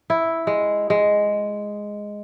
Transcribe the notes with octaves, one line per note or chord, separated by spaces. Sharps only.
E4
G#3
G#3